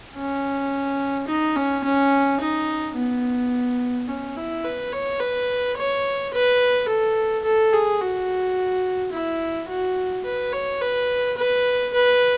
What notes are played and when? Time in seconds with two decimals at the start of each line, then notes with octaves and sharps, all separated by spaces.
0.16 C#4
1.28 D#4
1.56 C#4
1.84 C#4
2.40 D#4
2.96 B3
4.08 C#4
4.36 E4
4.64 B4
4.92 C#5
5.20 B4
5.77 C#5
6.32 B4
6.89 A4
7.44 A4
7.73 G#4
8.01 F#4
9.12 E4
9.69 F#4
10.25 B4
10.53 C#5
10.81 B4
11.37 B4
11.93 B4